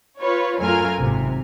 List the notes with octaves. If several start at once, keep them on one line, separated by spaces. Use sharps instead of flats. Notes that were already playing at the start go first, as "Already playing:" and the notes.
F4 B4 C#5
F#2 A3 F4 A#4 G#5 F6
G#1 C3